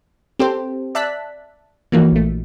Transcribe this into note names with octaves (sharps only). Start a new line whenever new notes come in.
C4 G4 A4 C5
D5 E5 A5 F#6 B6
E3 F3 A#3 D#4 F#4
A#1 A3